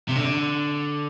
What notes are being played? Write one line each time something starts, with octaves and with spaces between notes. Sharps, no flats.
C3
D3